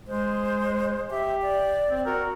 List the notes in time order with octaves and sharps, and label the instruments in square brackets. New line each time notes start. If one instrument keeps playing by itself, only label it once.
[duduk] G#3 [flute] C5
[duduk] G4 [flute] E5
[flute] D5
[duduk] C4
[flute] F#4 [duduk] A#4